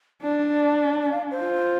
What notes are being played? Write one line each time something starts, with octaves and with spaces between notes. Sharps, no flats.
D4 D5
D5
F5
C5
F4